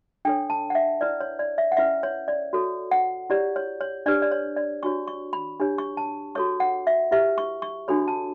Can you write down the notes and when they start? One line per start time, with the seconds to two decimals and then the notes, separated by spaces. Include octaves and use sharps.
0.25 D4 A4 C#5 G5
0.50 A5
0.70 F#5
0.75 E5
1.01 E4 B4 D5
1.21 C#5
1.39 D5
1.58 E5
1.72 F#5
1.77 C#4 E4 B4 E5
2.03 C#5
2.28 D5
2.53 F#4 A4 C#5
2.91 F#5
3.30 E4 G4 C#5 D5
3.56 C#5
3.81 C#5
4.06 D4 G4 B4 D5
4.22 D5
4.31 C#5
4.57 D5
4.83 D4 F#4 C#5 C#6
5.08 C#6
5.33 B5
5.60 D4 G4 C#5
5.78 C#6
5.97 A5
6.35 F#4 A4 C#5 C#6
6.60 F#5
6.87 E5
7.11 E4 G4 B4 E5
7.38 C#6
7.62 C#6
7.88 D4 F#4 A4 C#5 B5
8.08 A5